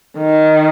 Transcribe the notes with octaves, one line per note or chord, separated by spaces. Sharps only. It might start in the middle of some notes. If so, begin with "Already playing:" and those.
D#3